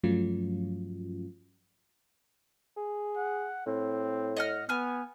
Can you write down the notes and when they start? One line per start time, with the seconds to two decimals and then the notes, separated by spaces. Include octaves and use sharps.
0.03 G2 F3 F#3 A3 C#4 F4
2.76 G#4
3.17 F#5
3.66 A2 C4
4.37 D#5 F#5 F6
4.69 B3 G#5 F6